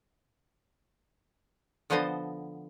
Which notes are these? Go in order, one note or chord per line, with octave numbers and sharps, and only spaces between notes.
D3 F3 B3 C5 D#5 A5